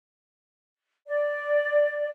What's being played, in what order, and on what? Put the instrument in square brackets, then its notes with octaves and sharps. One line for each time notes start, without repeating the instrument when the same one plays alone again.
[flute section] D5